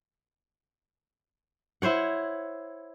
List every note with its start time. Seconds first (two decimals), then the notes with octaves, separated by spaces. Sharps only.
1.82 E4 C5 C#5 F#5